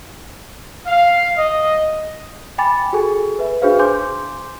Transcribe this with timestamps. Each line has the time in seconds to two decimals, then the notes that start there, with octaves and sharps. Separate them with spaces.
0.86 F5
1.38 D#5
2.58 G5 G#5 B5 D6 A6
2.93 F#4 G#4 A4 G#5
3.39 B4 E5
3.62 D4 F#4 G#4 B4 C5 F5
3.79 G#5 C6 D6 G6